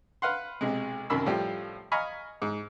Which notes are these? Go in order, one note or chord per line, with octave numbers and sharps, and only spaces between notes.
B4 F5 F#5 C6
B1 C3 G#3
C2 F#2 D#3 B5 E6
A2 F3 G3 G4
D#5 F5 G#5 A#5 B5 C#6
G#2